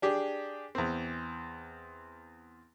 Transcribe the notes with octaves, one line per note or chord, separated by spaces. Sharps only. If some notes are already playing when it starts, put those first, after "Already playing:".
D4 G4 G#4
E2 C4